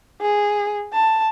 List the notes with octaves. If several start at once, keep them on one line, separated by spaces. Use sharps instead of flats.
G#4
A5